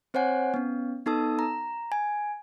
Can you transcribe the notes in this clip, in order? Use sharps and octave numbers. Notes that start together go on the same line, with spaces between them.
C4 C5 C#5 F#5 G#5
B3 C#4
B3 D#4 A4 A5 D#6 E6
A#5
G#5